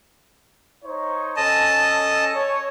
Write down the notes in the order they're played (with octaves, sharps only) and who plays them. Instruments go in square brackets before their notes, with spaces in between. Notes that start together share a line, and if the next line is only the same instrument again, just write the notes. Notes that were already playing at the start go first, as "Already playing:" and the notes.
[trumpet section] D#4 C5 C#5
[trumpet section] C#4 A4 [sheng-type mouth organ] D#5 A5
[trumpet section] C#5